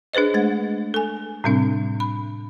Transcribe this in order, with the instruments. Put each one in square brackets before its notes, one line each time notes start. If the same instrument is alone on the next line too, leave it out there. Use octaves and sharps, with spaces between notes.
[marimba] D4 G#4 B4 C5 D#5
G#3 A3 A6
A4 G#5
A2 C3 G3 C4 D4
B5